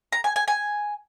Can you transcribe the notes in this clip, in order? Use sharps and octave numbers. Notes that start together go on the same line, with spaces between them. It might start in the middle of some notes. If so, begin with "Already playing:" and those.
A#5
G#5
G#5
G#5